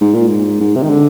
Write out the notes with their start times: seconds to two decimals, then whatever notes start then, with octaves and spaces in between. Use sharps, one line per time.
0.01 G#2
0.14 A#2
0.27 G#2
0.60 G#2
0.75 C3
0.83 D#3
0.89 D3